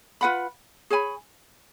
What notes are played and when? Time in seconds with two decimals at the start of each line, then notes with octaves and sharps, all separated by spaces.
0.21 F4 B4 F#5 B5
0.90 G#4 C#5 G#5 B5